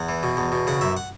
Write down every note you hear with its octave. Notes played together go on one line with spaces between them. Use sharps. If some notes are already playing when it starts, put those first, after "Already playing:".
Already playing: E2 F#5
E3
B2
E2
B2
C#3 F#5
F#2 E5
F#5